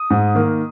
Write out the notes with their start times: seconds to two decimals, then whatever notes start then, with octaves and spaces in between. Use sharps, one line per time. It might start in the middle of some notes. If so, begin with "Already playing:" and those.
Already playing: D#6
0.10 G#2
0.35 D#3 A#3